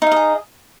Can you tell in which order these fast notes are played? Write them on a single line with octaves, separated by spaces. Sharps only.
D#4 F5 D#5 G#4